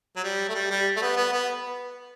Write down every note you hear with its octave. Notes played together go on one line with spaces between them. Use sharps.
F#3
G3
A3
G3
G3
A3
B3
B3
B3